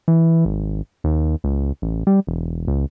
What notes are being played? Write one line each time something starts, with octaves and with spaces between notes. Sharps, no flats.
E3
G#1
D#2
C#2
A1
G3
E1
C#2